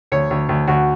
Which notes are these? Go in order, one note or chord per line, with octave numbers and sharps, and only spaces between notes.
D2 C#5
D2
D2
D2 F#4